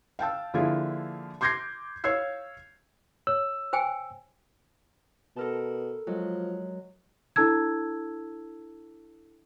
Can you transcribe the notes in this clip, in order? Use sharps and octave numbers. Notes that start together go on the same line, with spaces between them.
F5 G5 A5 E6
D3 F3 A#3 E4 F4 G#4
C6 D6 G6 G#6 A#6 C7
C#5 F5 E6 G#6 C7
C#5 E6
C5 G5 G#5
B2 A4 A#4 A5
F3 F#3 G#3
D4 E4 A4 A5 E6 G#6